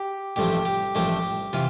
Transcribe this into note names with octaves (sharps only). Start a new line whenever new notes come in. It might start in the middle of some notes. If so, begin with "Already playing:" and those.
Already playing: G4
A1 G2 F3 A3 G4
G4
A1 G2 F3 A3 G4
C3 E3 F4